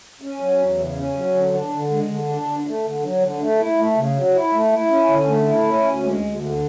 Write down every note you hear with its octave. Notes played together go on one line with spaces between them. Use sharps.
C#4
F#3
E2
C#3
C#4
F#3
D3
D4
D3
G#3
D3
D4
D3
A3
D3
F#3
D3
A3
E4
A3
C#3
F#3
E4
A3
E4
C#4
D3
A3
E4
C#4
D2
G#3
D2
D3